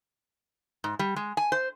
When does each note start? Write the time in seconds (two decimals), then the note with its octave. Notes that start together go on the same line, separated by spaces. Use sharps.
0.84 G#2
0.99 G3
1.16 G#3
1.37 G#5
1.52 C5